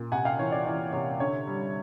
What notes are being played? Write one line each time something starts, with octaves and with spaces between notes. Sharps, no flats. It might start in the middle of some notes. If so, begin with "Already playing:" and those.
Already playing: A#2
C3 F#5 G#5
F5 G5
E3 C#5
D5
E3 D5
C3 C#5
D3 C#5
G3